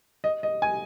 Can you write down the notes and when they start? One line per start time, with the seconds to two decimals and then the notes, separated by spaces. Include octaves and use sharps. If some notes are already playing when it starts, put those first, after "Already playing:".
0.24 D#5
0.43 D#5
0.62 G#5